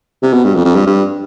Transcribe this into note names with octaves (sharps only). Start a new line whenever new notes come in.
C3
B2
G2
F2
F2
G2
G2